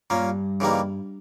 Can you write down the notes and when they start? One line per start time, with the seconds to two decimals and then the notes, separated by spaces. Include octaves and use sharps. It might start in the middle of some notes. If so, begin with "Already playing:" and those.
0.10 G2 A#2 A#3 C#4
0.60 C#3 E3 G3 A#3 D#4